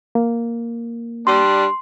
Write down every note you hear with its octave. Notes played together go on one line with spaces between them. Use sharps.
A#3
G3 D4 C6